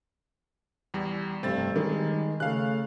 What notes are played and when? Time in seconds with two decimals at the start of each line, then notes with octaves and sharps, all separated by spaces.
0.94 E2 G3
1.43 F1 G2 C4 A6
1.76 D#3 G3 G#3
2.40 C#3 A3 F5 F#6